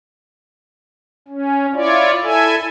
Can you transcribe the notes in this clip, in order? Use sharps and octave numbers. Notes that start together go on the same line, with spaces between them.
C#4
E4 F4 C#5 D5
E4 A4 E5 G#5